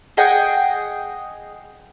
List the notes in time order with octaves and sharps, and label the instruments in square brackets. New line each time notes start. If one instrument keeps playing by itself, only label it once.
[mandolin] G#4 D#5 F#5 G5